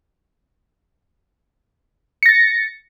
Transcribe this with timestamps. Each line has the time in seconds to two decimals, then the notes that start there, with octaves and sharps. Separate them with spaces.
2.23 C#7
2.26 A#6
2.29 A6